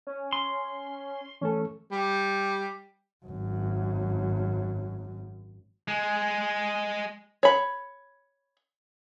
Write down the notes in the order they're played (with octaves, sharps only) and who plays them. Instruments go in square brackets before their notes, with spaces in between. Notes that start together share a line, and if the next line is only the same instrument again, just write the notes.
[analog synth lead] C#4
[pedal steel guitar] C6
[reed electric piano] E3 A3 A4 [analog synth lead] C#4
[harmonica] G3
[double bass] G#1 F#2
[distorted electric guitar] G#3
[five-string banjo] C#5 B5